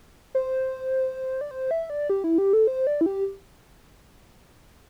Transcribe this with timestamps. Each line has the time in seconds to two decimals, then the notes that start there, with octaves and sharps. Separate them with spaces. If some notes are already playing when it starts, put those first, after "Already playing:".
0.35 C5
1.41 D5
1.51 C5
1.71 E5
1.90 D5
2.10 G4
2.24 E4
2.38 G4
2.53 A4
2.67 C5
2.87 D5
3.01 E4
3.06 G4